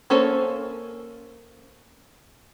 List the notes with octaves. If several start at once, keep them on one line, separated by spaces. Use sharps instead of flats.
A#3 C#4 A4 C5